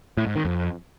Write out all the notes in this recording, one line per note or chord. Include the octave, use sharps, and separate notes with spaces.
A2
G#2
D#3
F2